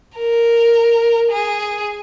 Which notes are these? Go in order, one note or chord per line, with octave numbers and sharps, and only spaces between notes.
A#4
G#4